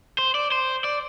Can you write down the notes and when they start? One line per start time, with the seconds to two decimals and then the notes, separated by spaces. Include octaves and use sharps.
0.19 C5
0.35 D5
0.52 C5
0.84 D5